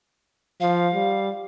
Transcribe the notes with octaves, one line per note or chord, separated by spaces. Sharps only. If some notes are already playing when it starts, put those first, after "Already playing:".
F3 F5
G3